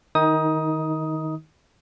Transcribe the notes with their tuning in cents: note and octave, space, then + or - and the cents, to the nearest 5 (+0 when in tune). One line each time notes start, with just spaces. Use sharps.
D#3 +0 D#4 +25 D#6 +10